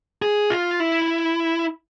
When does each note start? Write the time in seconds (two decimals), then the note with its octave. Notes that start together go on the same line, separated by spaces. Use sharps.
0.22 G#4
0.50 F4
0.80 E4